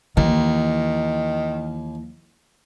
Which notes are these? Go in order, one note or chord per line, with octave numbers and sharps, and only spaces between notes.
D#2 D#3 E3